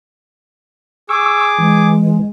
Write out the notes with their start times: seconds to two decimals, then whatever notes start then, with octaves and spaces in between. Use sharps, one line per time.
1.09 G#4 C#6 D6 E6
1.58 E3 G#3